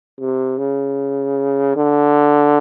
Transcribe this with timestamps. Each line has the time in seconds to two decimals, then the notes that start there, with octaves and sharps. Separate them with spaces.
0.20 C3
0.59 C#3
1.77 D3